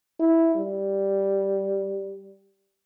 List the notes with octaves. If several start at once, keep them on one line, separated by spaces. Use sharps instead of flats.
E4
G3